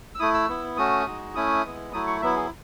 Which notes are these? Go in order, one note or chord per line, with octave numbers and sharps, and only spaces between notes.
E6
A3 E4 D#6
E6
B3 E4
A3 C#4 F#4 D#6
G#3 D#4 F#4
A3 C#4 E4 D#6
G#3 B3 E4
F#3 A3 E4 D#6
C#6
F#3 B3 E4 E5
G#4